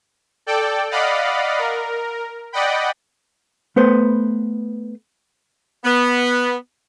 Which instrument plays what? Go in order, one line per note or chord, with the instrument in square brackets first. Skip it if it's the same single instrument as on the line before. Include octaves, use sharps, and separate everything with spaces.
[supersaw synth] A4 D5 G5
D5 D#5 F5 F#5 B5
A#4
D5 D#5 F#5 G5 B5
[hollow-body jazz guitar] A3 B3 B4 C5
[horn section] B3